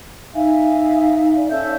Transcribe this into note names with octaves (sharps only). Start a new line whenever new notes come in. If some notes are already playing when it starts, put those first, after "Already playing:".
D#4 E5 F5 G#5
D5
C#4 A4 E5 G6